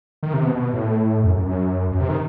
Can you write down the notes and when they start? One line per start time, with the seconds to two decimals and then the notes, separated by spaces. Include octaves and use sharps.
0.23 D#3
0.34 C3
0.44 B2
0.56 B2
0.73 A2
1.24 F#2
1.36 F#2
1.46 F#2
1.92 F#2
2.00 C3
2.09 D#3